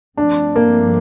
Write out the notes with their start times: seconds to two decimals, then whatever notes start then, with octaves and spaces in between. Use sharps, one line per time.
0.17 G2 F3 A3 C4 D4
0.56 A#3